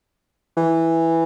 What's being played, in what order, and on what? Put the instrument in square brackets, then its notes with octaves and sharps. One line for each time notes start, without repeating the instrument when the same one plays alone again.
[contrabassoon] E3